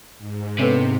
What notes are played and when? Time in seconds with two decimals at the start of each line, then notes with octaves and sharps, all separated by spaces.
0.19 G#2
0.59 C3 B3 C#4 A4 B4